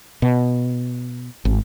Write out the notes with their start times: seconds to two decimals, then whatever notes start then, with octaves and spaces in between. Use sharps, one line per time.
0.22 B2
1.45 G#1